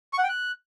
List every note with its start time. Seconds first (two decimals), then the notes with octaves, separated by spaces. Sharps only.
0.13 C#6
0.18 F#5
0.24 G5
0.29 F#6